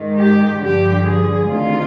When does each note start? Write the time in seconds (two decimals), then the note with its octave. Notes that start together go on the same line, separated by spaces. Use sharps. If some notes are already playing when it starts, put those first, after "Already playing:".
Already playing: G#2 D#3
0.18 G4
0.61 G2 D3 F3 G4
1.05 G#4
1.49 D2 C3 D#3 F4